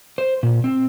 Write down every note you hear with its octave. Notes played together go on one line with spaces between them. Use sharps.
C5
A#2
C4